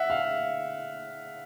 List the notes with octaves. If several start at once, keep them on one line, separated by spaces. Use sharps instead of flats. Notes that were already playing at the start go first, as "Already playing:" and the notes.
Already playing: E5 F#5
F5